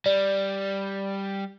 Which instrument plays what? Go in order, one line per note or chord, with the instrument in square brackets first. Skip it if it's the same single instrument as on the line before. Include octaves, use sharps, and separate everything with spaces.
[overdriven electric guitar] G3 [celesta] D5